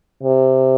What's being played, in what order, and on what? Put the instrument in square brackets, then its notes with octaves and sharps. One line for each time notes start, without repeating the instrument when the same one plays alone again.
[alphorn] C3